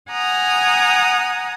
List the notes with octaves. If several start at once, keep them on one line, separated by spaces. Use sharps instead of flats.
F#5 G#5 A#5 D#6